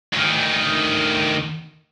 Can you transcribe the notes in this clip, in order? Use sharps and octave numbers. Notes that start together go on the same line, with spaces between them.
D2 D#3